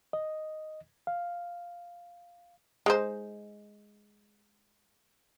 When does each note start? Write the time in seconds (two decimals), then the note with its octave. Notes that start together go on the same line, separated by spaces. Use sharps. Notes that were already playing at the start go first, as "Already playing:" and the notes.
0.13 D#5
1.07 F5
2.86 G#3 D#4 C5